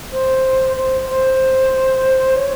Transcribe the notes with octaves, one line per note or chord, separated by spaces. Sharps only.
C5
C5
C5
C#5